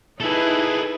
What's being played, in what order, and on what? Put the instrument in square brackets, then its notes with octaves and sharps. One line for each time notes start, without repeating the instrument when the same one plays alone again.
[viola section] D#4 E4 B4 [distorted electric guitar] G#4 A4